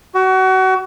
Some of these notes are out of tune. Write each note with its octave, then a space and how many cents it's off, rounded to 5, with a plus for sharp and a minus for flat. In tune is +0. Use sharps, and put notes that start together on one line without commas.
F#4 +30